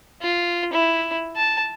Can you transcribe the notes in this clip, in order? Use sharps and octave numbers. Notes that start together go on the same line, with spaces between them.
F4
E4
A5